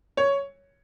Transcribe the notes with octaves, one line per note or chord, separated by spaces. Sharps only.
C#5